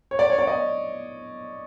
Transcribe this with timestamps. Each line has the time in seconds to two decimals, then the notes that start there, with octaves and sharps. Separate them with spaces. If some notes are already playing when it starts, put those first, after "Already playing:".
0.11 C#5
0.19 D5
0.30 C#5
0.39 D5
0.47 D#5